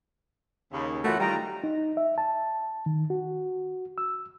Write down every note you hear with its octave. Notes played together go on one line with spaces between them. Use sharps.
D#2 C#3
F#2 E3 A3 F4 F#4
D#3 G3 F4 G5 A#5
D#4
E5
A5
D#3
F#4
E6